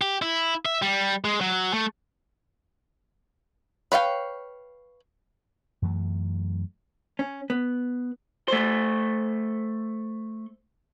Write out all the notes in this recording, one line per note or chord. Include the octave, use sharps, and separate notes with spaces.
G4
E4
E5
G3
G#3
F#3
A3
B4 C#5 F5 G5
F#2 E3 F#3 A3
C#4
B3
A3 C5